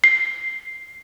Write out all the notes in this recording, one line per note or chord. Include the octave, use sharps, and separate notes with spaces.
C7